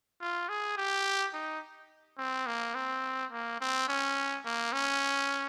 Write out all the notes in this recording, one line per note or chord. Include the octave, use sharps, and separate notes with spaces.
F4
G#4
G4
D#4
C4
A#3
C4
A#3
C4
C#4
A#3
C#4